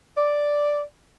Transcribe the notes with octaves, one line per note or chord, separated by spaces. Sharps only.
D5